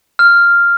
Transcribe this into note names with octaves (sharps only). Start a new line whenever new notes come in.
F6